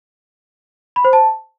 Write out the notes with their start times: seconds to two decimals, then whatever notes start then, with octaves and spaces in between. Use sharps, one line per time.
0.96 B5
1.05 C5
1.13 A5